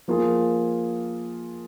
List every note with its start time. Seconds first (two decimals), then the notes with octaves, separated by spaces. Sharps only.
0.08 F3 A#3 F4 G#4